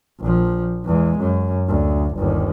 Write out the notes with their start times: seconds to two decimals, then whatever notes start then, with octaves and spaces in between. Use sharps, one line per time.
0.20 A#1 F3
0.85 E2 G#3
1.19 F#2
1.68 D2
2.16 G1 D#2